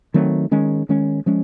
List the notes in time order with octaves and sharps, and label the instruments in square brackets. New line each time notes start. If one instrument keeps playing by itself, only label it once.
[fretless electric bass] D#3 F#3 A3 C4
D#3 G#3 C#4
D#3 G#3 C#4
F3 G#3 C#4